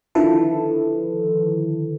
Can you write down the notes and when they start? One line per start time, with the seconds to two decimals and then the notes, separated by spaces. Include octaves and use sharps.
0.15 D3 D#3 F3 E4 A4 B4